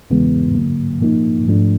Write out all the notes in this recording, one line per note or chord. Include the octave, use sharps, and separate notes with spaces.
E2 C#3 E3 G#3 B3
D3 F#3 A#3
A#2 F3 A#3 D#4
G#2 F3 A3 D4